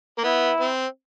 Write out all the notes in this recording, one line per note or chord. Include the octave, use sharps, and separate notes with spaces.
A#3
B3 E4
C4